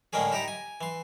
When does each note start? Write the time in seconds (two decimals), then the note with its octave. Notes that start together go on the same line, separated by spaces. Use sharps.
0.13 A2 D3 G#3 A#3 C#4 G#4
0.32 D#4 E4 G4 A#5
0.48 G#5
0.81 E3 C6